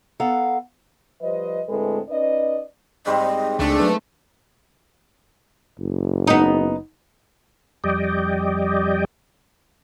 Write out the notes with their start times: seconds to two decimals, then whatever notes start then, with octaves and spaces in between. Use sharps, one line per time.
0.20 B3 A4 F5 F#5 A#5
1.21 F3 G3 B4 C5 D#5
1.68 D2 A2 G#3 C4 A4 B4
2.10 C#4 D#4 B4 D5 D#5
3.06 G#2 G3 C4 D#5
3.60 C#2 G#3 A3 D4
3.80 F#3 B4
5.79 F#1
6.27 B3 D#4
7.84 F2 G3 D5 D#5 G5